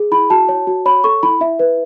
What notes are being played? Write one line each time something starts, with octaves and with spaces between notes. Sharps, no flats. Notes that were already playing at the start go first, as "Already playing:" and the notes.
Already playing: G#4
E4 B5
F#4 A5
C#5
F#4
C#5 B5
A4 C#6
E4 B5
E4 E5
B4